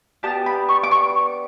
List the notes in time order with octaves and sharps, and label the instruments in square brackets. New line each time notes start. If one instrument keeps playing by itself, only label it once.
[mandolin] B3 D4 G4 A5
B5
C#6
D6
C#6